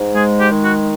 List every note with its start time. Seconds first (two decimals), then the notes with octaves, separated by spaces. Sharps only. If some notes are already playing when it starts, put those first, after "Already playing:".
Already playing: G#2
0.14 G#3 G#4
0.39 G4
0.51 D#3
0.63 F#4